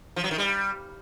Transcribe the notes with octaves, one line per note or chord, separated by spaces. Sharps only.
F3
F#3
D#3
G3